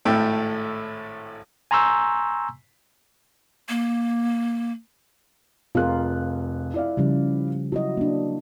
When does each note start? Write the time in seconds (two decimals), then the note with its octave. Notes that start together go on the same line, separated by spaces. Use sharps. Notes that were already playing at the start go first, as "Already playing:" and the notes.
0.05 G#1 A2 A3 G5
1.71 G#5 A#5 C6 C#6 E6 G6
3.69 A#3
5.75 F1 F4 G#4 A#4 F#6
6.74 E4 D5 F5
6.97 C#3 F3 G3
7.72 F#3 E4 F#4 D#5
7.97 A#3 D4